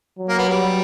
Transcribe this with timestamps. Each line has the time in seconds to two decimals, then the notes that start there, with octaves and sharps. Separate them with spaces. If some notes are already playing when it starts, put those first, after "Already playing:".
0.19 F#3
0.29 A#3
0.38 B3
0.49 G3